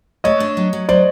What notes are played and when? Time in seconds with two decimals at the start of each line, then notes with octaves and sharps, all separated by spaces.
0.24 A3 C#5 D#5
0.40 D4
0.57 F#3
0.73 F#3
0.89 F#3 C5 D5